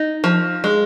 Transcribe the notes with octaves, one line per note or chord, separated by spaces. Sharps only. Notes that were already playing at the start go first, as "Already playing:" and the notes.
Already playing: D#4
F3
G#3